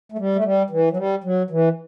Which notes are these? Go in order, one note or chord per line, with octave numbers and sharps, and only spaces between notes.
A3
G3
A3
G3
E3
F#3
G3
F#3
E3